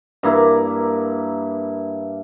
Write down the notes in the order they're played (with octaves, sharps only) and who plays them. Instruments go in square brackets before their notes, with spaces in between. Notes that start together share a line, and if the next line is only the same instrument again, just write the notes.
[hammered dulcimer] G2 A#3 E4 A#4